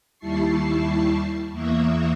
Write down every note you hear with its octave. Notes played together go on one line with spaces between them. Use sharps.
D#2 G3 E4 A5 C#6 C7
E2 E3 A#3 E5 C#6 D#6